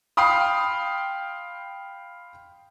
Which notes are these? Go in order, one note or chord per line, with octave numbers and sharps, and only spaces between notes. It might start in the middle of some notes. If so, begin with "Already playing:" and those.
F5 G5 B5 C6 D#6